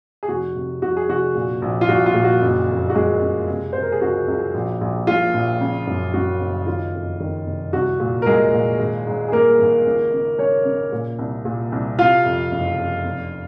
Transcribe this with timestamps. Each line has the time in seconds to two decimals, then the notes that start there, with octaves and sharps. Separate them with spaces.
0.23 G#4
0.28 F1 F#4
0.56 C3
0.82 F1 F#4
0.97 G#4
1.09 F1 F#4
1.35 A#2
1.62 A#1
1.81 F4
1.89 A#1 F#4
2.06 F4
2.15 A#2
2.24 F#4
2.41 F#1
2.69 F2
2.90 F#4
2.95 C#3 G#3 G#4
3.21 F#1
3.48 C3
3.73 C3 C5
3.82 A#4
3.92 G#4
4.01 C#2 F#4
4.28 C#2
4.54 A#1
4.81 A#1
5.07 A#2 F4
5.34 A#1
5.61 C#3
5.87 F#2
6.14 F#2 F#4
6.40 F#1
6.67 D#3 F4
6.94 F2
7.20 D#3
7.47 F1
7.73 C2 F#4
8.00 A#2
8.22 A#4
8.26 A#2 G#3 G#4
8.53 A#2
8.79 G#1
9.07 G#2
9.28 G#4
9.32 G#1 A#3 A#4
9.59 G#1
9.86 C#2
10.13 C#3
10.38 C#3 C#4 C#5
10.65 C#3
10.92 A#2
11.19 C2
11.45 A#2
11.72 C2
11.99 C3 F4 F5
12.25 F2
12.51 F#1
12.78 F2
13.05 F1